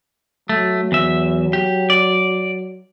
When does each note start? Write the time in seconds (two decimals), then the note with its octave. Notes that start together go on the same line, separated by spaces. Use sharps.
0.49 F#3 A3
0.92 E2 E5
1.53 G4
1.90 D5